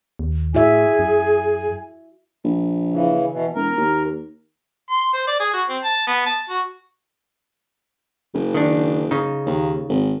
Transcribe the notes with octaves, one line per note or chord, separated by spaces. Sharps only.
D#2
A2 E4 F#4 G#4 E5 G#5
F#2
A#1
C#3 E3
B2 E3
E1 A#4
D#2
C6
C5
D5
G#4
F#4
C4
A5
B3
A5
F#4
F#1
D#3 D4
C#3 D#4
D#2
G#1